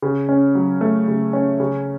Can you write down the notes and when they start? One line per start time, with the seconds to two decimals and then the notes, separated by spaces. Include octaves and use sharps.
0.02 C#3
0.29 C#4
0.55 F#3
0.81 A3
1.08 C#3
1.33 C#4
1.60 C#3